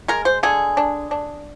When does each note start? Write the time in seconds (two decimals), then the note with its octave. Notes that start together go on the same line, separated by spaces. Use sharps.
0.08 G#3 A#4
0.25 C5
0.43 D3 G#4
0.77 D4
1.11 D4